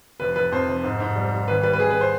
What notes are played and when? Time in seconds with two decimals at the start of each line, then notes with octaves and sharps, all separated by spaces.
0.20 F1 B4
0.36 F1 B4
0.52 F2 C5
0.68 F1
0.84 G#2
1.00 G#2
1.16 G3
1.32 G3
1.48 G#1 B4
1.63 G3 B4
1.73 B4
1.80 G#1 G#4
1.90 B4
2.01 C5